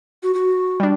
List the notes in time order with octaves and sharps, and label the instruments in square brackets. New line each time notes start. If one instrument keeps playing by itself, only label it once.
[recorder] F#4
F#4
[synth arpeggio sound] G3 D4